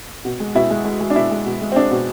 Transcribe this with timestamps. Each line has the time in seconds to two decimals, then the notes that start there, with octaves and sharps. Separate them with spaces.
0.25 B2
0.40 G#3
0.55 B2 E4
0.71 G#3
0.85 G#3
1.01 G#3
1.10 D4
1.16 B2 E4
1.31 G#3
1.46 B2
1.61 G#3
1.72 C4
1.76 G#3 D4
1.91 B2